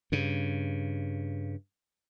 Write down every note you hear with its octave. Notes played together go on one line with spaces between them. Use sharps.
G2 C#3